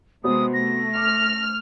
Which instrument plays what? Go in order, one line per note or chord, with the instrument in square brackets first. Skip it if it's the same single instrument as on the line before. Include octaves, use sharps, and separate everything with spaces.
[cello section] C3 G#3 [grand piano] B3 F#4 C5 [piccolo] D#6
[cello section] A3 [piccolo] A#6
[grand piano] D6 [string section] F6